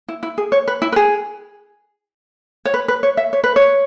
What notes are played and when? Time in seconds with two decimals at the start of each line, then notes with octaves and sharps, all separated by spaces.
0.09 E4
0.23 E4
0.38 G#4
0.52 C#5
0.68 B4
0.82 E4
0.92 B4
0.96 G#4
2.65 C#5
2.74 B4
2.88 B4
3.03 C#5
3.17 E5
3.33 C#5
3.44 B4
3.56 C#5